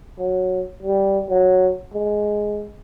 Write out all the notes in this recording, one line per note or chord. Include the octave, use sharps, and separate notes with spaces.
F#3
G3
F#3
G#3